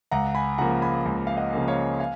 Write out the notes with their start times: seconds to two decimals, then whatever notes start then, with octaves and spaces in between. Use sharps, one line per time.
0.11 C#2 F#5 A#5
0.35 G#5 B5
0.58 C#3 F3 A#3 F#5 A#5
0.82 G#5 B5
1.06 C#2
1.27 F5
1.37 D#5 F#5
1.53 C#3 F3 A#3
1.68 C#5 F5
2.00 F5 G#5